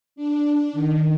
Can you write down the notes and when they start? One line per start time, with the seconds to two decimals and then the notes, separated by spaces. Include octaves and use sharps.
0.16 D4
0.73 D#3